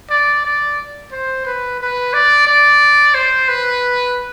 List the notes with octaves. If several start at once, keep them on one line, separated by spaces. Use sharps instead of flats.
D5
D5
C5
B4
B4
D5
D5
C5
B4